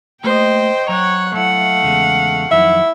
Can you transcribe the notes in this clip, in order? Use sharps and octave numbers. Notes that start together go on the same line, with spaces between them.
A3 A#3 G4 C5 D#5 G5
F#3 C5 C#5 F#5 A#5
F#3 A3 E4 F5 F#5
E2 C#3 G#3
F2 D#3 F#3 E4 E5